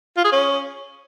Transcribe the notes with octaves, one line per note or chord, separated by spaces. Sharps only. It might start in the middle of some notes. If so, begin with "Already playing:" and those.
F4
G#4
C#4